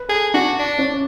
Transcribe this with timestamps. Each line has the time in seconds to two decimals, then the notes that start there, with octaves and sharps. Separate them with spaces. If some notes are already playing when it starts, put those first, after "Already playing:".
Already playing: B4
0.09 G#4 A4
0.34 D4 F#4
0.59 D4
0.78 C#4